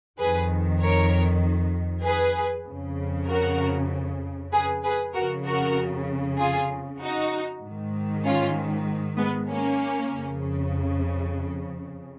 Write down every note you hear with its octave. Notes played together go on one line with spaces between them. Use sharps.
F2 D#3 G#4 B4
A#4 C#5
G#4 B4
F2 C#3
F#4 A#4
G#4 B4
G#4 B4
F2 C#3 F#4 A#4
F#4 A#4
F4 G#4
D#4 F#4
G#2 D#3
C#4 F4
G#3 B3
A#3 C#4
F2 C#3